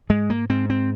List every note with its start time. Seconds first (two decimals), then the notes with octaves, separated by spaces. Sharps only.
0.09 G#2 G#3
0.30 A#3
0.49 G#2 C4
0.70 C4